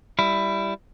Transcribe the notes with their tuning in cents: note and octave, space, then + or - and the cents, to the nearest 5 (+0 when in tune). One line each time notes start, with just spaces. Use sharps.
G3 +0 E4 +10